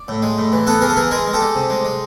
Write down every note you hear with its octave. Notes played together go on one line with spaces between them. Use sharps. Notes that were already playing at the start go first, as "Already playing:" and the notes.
Already playing: D5
A2
G#3
A2
E3
B3 A4 B4
E3 G#4 A#4
A4
E3 G#4 A#4
G#3 G#4 A#4
G#3
G4 A4
G#3
C3
G#3
G#3